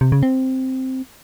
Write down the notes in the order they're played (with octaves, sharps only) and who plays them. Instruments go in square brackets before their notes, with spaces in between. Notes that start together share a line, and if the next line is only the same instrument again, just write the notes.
[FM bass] C3
C#3
C4